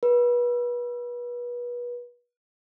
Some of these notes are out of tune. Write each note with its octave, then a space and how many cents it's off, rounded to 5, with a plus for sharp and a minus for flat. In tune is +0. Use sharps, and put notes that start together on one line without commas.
B4 -30